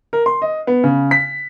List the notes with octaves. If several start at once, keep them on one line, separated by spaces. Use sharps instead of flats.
A#4
C6
D#5
B3
C#3
B6